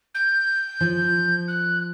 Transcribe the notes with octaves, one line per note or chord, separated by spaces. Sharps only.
G6
F3
F#6